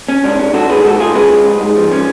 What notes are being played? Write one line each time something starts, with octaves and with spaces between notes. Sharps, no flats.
C#4
G#2 D4
C#4
G#2 F#4 A4
G#2 G#4 B4
G#2 F#4 A4
G#3 F4 G#4
C#4 G#4 B4
G#3
G#2
G#2
F3
C#4